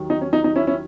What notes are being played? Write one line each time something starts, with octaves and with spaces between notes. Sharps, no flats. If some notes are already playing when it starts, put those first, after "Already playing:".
Already playing: D#2 D#3 F#3
D#4
C#4
D#4
D#4
C#4 E4
C#4 E4